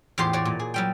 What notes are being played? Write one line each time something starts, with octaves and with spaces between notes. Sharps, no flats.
E2 A2 F4 G4 C5 C6
F#4 C#5 D5
A#2
G#4
F#3 G3 G5